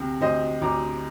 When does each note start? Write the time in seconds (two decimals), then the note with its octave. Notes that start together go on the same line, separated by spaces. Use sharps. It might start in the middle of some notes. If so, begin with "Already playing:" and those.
Already playing: D2 C3
0.21 D2 C5 D#5
0.62 D2 A#5 D6